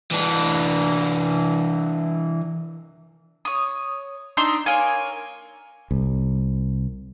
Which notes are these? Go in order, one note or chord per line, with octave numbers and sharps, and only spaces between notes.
E3 D4
C#5 D#6
D4 D#4 C6 E6
A#3 C#5 G#5
C2